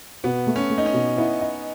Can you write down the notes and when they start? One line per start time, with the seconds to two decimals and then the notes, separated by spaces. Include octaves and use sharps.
0.24 B2 B3
0.47 A3
0.56 C#4
0.70 A3
0.78 D#4
0.86 C#4
0.93 B2
1.17 B3 E4
1.41 D#5